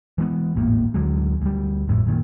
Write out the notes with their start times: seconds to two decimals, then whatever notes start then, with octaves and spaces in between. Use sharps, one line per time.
0.18 E3 G#3 A3 B3
0.55 D#1 G#1 A2 A#3
0.94 D2 D3 F#3 G#3
1.42 D2 G3
1.88 A1 F2 A2
2.07 F#2 A#2 D#3